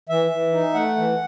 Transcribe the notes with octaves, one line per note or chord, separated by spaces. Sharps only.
E3 E5
E3
D#4
A3 F#5
E3